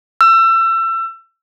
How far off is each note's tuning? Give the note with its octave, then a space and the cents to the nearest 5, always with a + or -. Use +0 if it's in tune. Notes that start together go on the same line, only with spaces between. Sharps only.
E6 +30